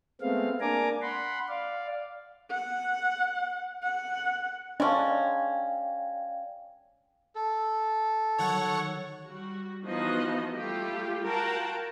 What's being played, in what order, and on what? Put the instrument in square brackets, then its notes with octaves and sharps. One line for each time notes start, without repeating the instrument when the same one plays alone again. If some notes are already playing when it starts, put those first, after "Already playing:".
[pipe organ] G#3 A3 B3 C4 F5
A#3 D4 G#5 A#5 D6
F#5 B5 C6
D5 F5
[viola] F#5
F#5
[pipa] G#3 C#4 [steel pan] D4 [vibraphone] D5 F5 G5
[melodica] A4
[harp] D#3 F#3 [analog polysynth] C#5 F#5 C#6
[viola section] G3 F#4
E3 F3 B3 D#4 F#4 D#5
G3 A3 F4 G4
F4 F#4 A#4 F#5 G5 A5